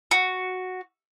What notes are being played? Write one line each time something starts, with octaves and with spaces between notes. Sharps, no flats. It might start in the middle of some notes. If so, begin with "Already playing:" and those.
F#4